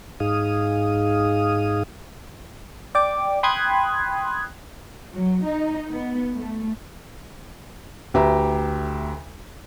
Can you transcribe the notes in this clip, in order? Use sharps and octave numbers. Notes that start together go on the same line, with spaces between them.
G#2 D#4 G#4 F5 D#6
D5 G5 D6
G5 B5 C6 D#6 F#6 G#6
F#3
D#4
B3
A3
D2 G4 B4 E5 A#5